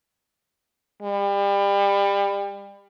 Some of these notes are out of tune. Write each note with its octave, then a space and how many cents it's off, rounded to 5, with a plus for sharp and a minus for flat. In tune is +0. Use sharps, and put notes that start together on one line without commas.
G3 +30